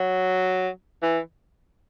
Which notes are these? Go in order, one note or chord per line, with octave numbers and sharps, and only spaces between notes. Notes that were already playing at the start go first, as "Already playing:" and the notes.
Already playing: F#3
E3